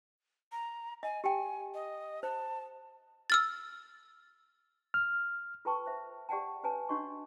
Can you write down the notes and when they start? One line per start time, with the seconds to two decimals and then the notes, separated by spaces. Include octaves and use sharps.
0.52 A#5
1.03 D#5 G#5
1.24 G4 G5 G#5
1.74 D#5
2.23 C5 A5
3.30 E6 F6 A6
4.94 F6
5.65 F4 A4 B4 G5 A5 C#6
5.86 C5 E5
6.29 G4 D5 F#5 G5 A5
6.63 C#4 B4 C#5 G#5 A5
6.89 C#4 D4 F#4 D#5 C#6